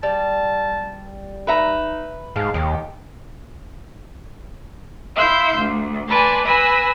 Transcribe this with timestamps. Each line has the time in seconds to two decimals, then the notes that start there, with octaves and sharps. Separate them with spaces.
0.03 G3 A5
1.47 D#4 B4 E5 A#5
2.36 G#2 G#3 F5 A5
2.54 D#2 D#3 G4 D#5
5.16 E4 F5 C6 E6 G6
5.58 D2
6.09 B4 D5 G#5 A5 B5 C6
6.46 B4 G#5 B5 E6 A#6